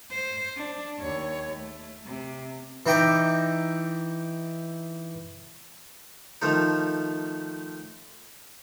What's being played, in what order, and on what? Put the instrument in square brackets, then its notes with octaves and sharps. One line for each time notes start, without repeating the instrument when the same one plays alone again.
[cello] C5
D4
D#2 C#5
A3
C3
[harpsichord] E3 D#4 E5 G5 A#5 D6
D#3 F3 A3 D#4